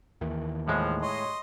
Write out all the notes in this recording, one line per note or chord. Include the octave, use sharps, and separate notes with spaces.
D#2 D#3 E3
A2 F3 G#3
C#5 D#5 C6